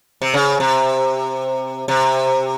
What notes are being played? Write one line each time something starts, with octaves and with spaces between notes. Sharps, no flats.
C3
C#3
C3
C3